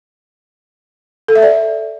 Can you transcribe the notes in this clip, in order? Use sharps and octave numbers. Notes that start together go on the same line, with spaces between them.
A4
E5
D5